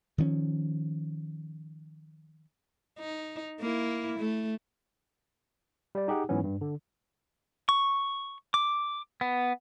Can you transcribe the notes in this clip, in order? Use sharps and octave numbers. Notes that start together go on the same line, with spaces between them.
D#3 F3 B3 C#4
D#4
A#3 E4
A3
G3 D5
D#4 G4 G#4 F#5
G#2 E3 F#3 B3 C#4
G2
D3
C#6
D6
B3